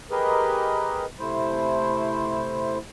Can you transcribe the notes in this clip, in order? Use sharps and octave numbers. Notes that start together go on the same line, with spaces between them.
G4 G#4 A#4 B4 D#5
C3 A3 E4 C5